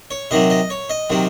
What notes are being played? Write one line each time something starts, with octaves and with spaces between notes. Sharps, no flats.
C#5
C3 D#3 F#3 D#5
D#5
C#5
D#5
C3 D#3 F#3